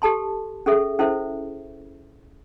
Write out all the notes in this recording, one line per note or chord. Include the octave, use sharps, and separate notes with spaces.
G4 A4 A5 C6
C#4 G#4 A4 E5
C#4 E4 A4 C5 E5